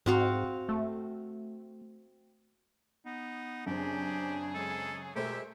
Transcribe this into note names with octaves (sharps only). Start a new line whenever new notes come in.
G#2 C4 F#4 F5
A3
B3 D#4
F#2 C#3 C4 D4 G4 G#4
G#3 A4
B2 G#3 A3 G4 A#4 C5 E5